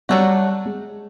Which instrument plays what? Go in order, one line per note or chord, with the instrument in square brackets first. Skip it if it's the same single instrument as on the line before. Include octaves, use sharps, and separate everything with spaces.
[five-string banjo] F#3 A3 D4 F#4 [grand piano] G3
[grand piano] G#3